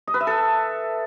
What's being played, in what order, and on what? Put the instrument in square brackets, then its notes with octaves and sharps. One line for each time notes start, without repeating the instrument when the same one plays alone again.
[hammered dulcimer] D#5
B4
E5
A4